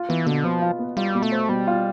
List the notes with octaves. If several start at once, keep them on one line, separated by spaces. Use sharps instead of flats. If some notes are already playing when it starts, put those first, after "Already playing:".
Already playing: F4
E3 B3
B2 D3
F3 B3
F4
B3
G3 F4
B2
A3
C5
B2 G3
F4